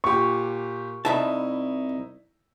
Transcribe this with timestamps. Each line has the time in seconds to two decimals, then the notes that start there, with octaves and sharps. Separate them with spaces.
0.04 A#2 G4 C#6
1.05 C2 D#4 E4 E5 A5